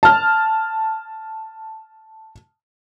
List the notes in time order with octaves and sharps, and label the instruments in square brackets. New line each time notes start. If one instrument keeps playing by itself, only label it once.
[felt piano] A5 F6